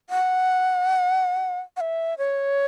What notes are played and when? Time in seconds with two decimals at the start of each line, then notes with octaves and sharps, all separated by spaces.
0.10 F#5
1.77 F#5
1.81 E5
2.18 C#5